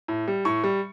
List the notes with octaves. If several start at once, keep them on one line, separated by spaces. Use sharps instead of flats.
A2
G3
A2 C#6
G3